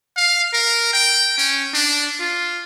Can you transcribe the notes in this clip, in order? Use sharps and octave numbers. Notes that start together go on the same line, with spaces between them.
F5
A#4
G5
C#4
D4
F4